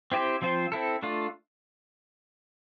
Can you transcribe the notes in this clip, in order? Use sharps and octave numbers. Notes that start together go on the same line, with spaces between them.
C4 E4 G4 C5
F3 C4 F4 C5
C4 E4 A4
A3 D4 F4